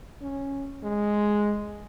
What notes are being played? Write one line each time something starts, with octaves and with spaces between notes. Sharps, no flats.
C#4
G#3